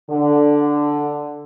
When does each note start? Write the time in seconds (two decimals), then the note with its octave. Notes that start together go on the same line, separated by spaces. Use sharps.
0.10 D3